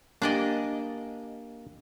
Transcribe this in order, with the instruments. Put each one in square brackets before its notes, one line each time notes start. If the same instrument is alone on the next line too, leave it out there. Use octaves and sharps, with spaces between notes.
[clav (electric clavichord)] A#3 G4 G#5 [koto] D4 D5 D#5